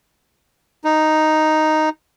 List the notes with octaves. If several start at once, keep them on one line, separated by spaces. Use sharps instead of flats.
D#4